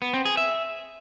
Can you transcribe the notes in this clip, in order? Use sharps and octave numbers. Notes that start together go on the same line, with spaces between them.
B3
C4
G#4
E5